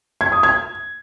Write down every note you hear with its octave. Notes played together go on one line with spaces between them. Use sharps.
G#6
D#6
G#6